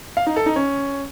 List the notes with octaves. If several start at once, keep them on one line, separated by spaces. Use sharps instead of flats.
F5
D#4
A4
D#4
C#4